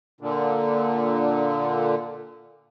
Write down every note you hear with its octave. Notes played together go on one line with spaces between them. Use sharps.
A#2 D3